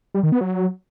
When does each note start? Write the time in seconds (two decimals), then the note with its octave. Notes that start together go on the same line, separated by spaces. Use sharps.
0.14 G3
0.23 D#3
0.32 B3
0.41 F#3